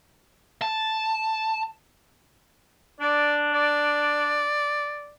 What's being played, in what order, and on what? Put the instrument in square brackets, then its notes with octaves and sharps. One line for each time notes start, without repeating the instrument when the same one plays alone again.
[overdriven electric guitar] A5
[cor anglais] D4 [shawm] D5
[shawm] D5